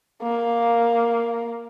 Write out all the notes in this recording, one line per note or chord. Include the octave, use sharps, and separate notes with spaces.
A#3